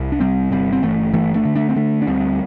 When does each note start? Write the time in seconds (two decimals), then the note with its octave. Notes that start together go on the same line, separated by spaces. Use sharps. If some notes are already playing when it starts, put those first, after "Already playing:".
Already playing: C2
0.12 D4
0.20 C3 G3 C4
0.51 G1 G3 C4
0.73 C4
0.83 G1 E3 A3
1.13 G2 E3 A3
1.35 A3 D4
1.45 D3
1.55 A3 D4
1.69 C4
1.76 D3 A3 D4
2.02 D4
2.07 D2 G3 C4